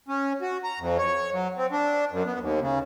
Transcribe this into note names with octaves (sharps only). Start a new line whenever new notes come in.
C#4
F#4
A#5
F2
C#5
F#3
C4
D4
F#2
B3
D#2
C#3